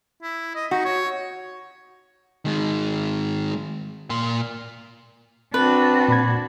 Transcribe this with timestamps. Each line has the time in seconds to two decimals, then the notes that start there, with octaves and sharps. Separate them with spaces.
0.22 E4
0.55 D#5
0.71 D#4 F#4
0.85 C#5
2.45 D#3 G#3
4.10 A#2 C6
5.54 C4 D4 F#4 B4
6.08 A#2 B5 G#6